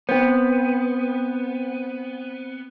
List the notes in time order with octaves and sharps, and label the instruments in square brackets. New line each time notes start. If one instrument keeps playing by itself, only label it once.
[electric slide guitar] B3 [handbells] C4 C5